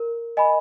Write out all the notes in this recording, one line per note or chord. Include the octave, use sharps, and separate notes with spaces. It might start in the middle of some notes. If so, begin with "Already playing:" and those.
Already playing: A#4
D#5 G#5 B5